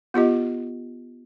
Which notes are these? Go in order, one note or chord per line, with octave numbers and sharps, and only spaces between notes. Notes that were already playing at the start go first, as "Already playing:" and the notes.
B3 F4 G4 D#5